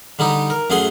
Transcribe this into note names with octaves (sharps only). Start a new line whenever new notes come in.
D3 G3 D#4 G4
A#4
F#2 A3 G#4 F#5 C6